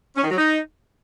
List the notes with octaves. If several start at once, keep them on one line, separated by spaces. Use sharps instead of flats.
C#4
D#3
F#3
D#4